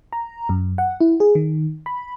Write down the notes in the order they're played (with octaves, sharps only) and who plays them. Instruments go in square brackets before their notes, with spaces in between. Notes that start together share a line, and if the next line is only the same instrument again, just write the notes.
[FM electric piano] A#5
F#2
F#5
E4
G#4
D#3
B5